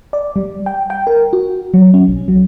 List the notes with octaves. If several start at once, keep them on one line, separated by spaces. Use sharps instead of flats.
D5
G3
G5
G5
A#4
F#4
F#3
C#4
B1
F#3